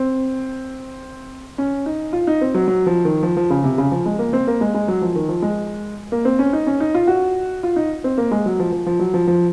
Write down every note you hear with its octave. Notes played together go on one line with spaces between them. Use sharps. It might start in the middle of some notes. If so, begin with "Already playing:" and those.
Already playing: C4
C#4
D#4
F4
D#4
C4
F#3
F#3
F3
D#3
F3
F3
C#3
C3
C#3
F3
G#3
A#3
C4
A#3
G#3
G#3
F#3
F3
D#3
F3
G#3
A#3
C4
C#4
D#4
C#4
D#4
F4
F#4
F4
D#4
C4
A#3
G#3
F#3
F3
F3
F3
F#3
F3
F3